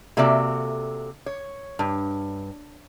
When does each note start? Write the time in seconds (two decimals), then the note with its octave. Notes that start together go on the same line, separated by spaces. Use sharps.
0.17 C3 A#3 F#4 A4 D5 E5
1.26 C#5
1.79 G2